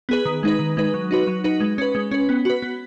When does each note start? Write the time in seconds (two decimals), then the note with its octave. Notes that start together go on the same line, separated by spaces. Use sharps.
0.09 B3 G#4 B4
0.26 D#3
0.43 G#3 D#4 B4
0.59 D#3
0.77 G#3 D#4 B4
0.94 F#3
1.11 D#4 F#4 B4
1.27 F#3
1.44 D#4 F#4 B4
1.60 G#3
1.78 C#4 B4
1.95 G#3
2.11 C#4 B4
2.29 B3
2.45 F#4 B4
2.62 B3